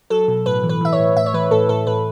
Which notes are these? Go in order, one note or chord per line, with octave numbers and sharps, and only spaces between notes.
F#3 A4
B2
A2 B4
E3
B4
E3 E5
C#5
A2
A2 E5
C#5
E3 B4
A2 A4
A2 A4
A2 B4